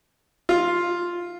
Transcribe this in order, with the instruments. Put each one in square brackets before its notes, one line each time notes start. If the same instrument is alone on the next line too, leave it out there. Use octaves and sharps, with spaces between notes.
[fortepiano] F4